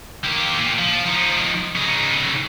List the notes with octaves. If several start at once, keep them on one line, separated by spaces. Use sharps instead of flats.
A#3 G4
A#2
F3
F3 D#4
C#3 D#4